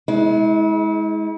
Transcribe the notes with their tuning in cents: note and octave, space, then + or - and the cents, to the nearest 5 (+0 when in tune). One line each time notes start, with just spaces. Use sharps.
G#3 +25 E4 -40